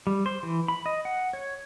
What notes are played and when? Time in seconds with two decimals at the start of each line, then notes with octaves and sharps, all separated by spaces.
0.07 G3
0.26 C5
0.43 E3
0.68 B5
0.86 D#5
1.05 F#5
1.33 C#5